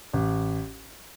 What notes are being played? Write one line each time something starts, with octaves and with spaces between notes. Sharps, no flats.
A1